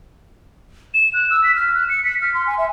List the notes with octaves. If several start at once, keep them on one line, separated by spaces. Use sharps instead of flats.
E7
F#6
E6
B6
F6
F#6
C#7
B6
F6
C6
G#5
E5